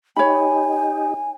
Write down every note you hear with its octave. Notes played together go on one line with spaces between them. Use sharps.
D#4 G4 C#5 G#5 B5